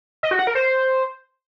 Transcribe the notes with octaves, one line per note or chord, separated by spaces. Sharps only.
D#5
F#4
F#5
A#4
C5